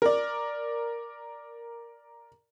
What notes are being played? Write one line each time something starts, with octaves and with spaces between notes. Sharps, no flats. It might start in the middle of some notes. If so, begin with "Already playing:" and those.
A#4 D5